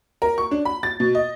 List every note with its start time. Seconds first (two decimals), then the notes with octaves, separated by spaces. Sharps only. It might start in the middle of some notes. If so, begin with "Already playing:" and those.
0.22 A#4
0.38 C#6
0.51 D4
0.65 B5
0.83 A6
1.00 B2
1.15 D#5